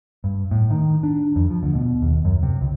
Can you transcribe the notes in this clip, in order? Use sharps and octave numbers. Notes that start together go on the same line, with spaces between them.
G2
A2
D#3
D4
F2
F3
D2
B2
D#2
F#2
C3
C#2